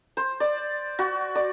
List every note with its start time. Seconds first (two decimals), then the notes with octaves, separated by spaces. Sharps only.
0.17 C5
0.40 D5
0.99 F#4
1.35 D5